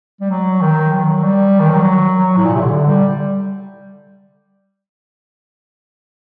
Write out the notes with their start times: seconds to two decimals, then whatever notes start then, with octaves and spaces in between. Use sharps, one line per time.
0.21 G3
0.30 F#3
0.61 D#3
0.92 F#3
1.23 G3
1.60 D#3
1.70 F#3
2.17 F#3
2.37 A2
2.45 A#2
2.54 C3
2.63 D3
2.86 G3